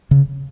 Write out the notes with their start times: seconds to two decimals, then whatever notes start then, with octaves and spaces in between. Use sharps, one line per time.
0.11 C#3